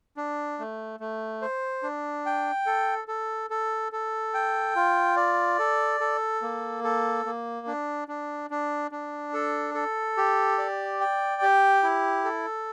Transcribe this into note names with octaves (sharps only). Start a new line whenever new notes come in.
D4
A3
A3
C5
D4
G5
A4
A4
A4
A4
G5
F4
D5
A4
A4
A#3
A4
A#3
D4
D4
D4
D4
A4
A4
G4
D5
G5
G4
E4
A4